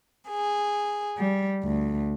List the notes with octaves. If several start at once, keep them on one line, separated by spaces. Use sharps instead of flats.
G#4
G3
D2